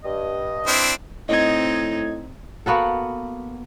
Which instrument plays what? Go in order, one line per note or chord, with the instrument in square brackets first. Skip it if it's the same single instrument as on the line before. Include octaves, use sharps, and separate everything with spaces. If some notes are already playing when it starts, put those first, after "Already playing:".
[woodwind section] G2 D#5
[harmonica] C4 D4 E4
[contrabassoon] A2 [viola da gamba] C4 D#4 [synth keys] D#5 G#6
[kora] A#3 B3 F#4 A4